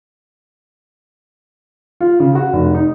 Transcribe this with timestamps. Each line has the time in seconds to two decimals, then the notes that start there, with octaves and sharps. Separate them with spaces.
2.01 F4
2.20 C#3
2.35 F#4
2.53 F1
2.75 D#4